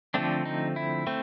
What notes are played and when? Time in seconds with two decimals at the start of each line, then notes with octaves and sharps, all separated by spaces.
0.14 D3 F3 A3 C4 D4
0.45 D#4
0.76 E4
1.07 A3 C4